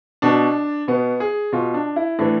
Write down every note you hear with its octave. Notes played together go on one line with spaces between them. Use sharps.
B2 D4
B2 B3
G#4
B2 F4
D4
E4
A2 E3 D4